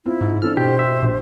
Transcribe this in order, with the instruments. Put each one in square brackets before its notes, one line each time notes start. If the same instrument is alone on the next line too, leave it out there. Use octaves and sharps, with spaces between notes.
[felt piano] C4 F4 [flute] E4
[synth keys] G#2
[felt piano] E3 C4 D4 [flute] A4 [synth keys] F6
[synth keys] B2 [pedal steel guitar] G4 [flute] C5
[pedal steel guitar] E5
[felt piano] A#1